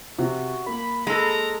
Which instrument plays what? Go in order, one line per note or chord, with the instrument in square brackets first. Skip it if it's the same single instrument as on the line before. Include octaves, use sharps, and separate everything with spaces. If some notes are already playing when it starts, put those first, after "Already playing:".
[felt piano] C3 [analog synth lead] F#4
[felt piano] A#3 [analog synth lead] B5
[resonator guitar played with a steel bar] G#3 A4 [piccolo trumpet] A#5